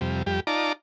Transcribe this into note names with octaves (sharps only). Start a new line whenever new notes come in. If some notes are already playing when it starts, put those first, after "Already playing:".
F2 C3 G3
F2 G3 G4
D#4 F4 D5 A5 A#5 D6